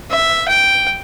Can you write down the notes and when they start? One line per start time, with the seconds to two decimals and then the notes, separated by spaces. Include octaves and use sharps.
0.10 E5
0.48 G5